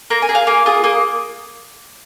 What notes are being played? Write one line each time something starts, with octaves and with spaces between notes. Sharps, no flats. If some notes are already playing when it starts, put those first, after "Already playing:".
A#3 A#5
G#5
G#4
F5
A#3 G#5
F4 G#4 D#6
A#3 D#6